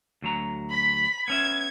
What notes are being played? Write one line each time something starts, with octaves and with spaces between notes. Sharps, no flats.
D2 F#3 A#5
B5 B6
B3 C#4 E5 G#6